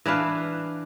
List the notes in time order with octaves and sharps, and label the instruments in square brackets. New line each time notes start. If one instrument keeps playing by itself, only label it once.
[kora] E3 D4 B4 F5